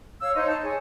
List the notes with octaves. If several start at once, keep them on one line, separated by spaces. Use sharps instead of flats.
C#5 F5 E6
D#4 C5 C#5 D#5
A5
G#4 C#5